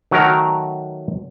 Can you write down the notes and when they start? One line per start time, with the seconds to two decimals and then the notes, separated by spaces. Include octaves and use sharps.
0.11 D#3 F#3 A3 F#4 A#4 A#5